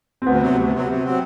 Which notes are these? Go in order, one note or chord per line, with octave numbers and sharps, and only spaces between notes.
C4
D2 B3
C3 F#3
D2
C3 F#3
C3
F#3 C4